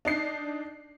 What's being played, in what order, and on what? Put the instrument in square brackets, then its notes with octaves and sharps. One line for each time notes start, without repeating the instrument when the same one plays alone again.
[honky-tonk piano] D4 D#4 C7